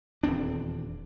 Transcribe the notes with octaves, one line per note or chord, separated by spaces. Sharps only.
D#1 E2 C4 D4